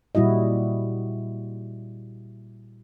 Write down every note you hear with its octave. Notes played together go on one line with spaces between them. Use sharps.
A#2 G3 E4 F#4 D#5